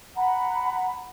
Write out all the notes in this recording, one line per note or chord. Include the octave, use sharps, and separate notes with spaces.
F#5 A#5 B5